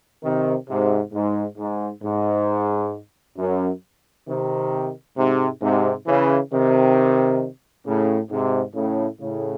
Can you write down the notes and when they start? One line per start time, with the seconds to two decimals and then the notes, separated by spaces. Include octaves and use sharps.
0.23 C3 D#3
0.69 G#2 C3
1.13 G#2
1.59 G#2
2.03 G#2
3.38 F#2
4.27 C3 D#3
5.18 G#2 C3
5.61 G#2 C3
6.06 C#3 E3
6.52 C3 D#3
7.86 A2 C#3
8.31 G#2 C3
8.76 A2 C#3
9.20 A2 C#3